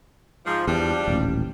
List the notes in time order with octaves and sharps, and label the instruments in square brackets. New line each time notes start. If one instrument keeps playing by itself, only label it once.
[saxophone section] G#2 F3
[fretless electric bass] E2 [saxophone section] F3 G3 D4
[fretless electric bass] D#1 A1